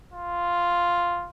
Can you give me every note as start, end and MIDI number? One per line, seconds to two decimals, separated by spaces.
0.13 1.29 65